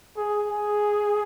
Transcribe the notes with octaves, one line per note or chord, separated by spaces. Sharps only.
G#4
G#4